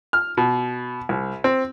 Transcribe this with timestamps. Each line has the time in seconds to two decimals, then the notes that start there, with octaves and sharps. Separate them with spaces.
0.13 F6
0.37 B2
1.09 C2
1.44 C4